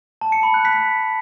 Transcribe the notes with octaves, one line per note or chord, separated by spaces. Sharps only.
A5
C#7
B5
F#6
B6